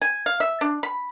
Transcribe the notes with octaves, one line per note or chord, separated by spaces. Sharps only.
G#5
F5
E5
D4
B5